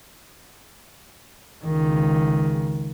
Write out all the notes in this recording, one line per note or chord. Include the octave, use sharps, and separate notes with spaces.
C#2 D#3